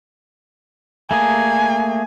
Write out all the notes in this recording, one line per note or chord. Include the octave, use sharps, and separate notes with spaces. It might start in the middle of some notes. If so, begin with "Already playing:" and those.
A3 A#3 G#4 G#5